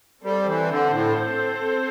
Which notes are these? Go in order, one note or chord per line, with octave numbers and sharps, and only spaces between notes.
G3 C4 A4 C5
E3
D3
A2